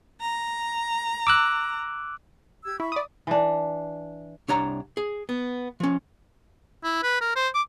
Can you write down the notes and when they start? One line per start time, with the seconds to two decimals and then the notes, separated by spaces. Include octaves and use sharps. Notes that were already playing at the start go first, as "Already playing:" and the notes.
0.20 A#5
1.27 D6 E6 F#6
2.64 G4 E6 G#6
2.80 E4 E5 B5 C#6
2.92 D5 D#6
3.27 E3 D4
4.48 C2 D4 C#5 F#5 A#5
4.97 G#4
5.29 B3
5.80 F3 C#4
6.84 E4
7.03 B4
7.21 A#4
7.36 C5
7.55 D6